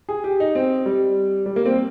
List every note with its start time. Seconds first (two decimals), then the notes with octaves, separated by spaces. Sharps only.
0.09 G#4
0.24 G4
0.40 D#4
0.55 C4
0.86 G3
1.46 G3
1.56 A#3
1.66 C4